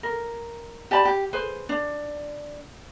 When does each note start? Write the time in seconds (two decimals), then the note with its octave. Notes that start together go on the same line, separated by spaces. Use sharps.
0.03 A#4
0.91 G4 D5 A5 B5
1.05 G4
1.33 G#4 B4 C5
1.69 D4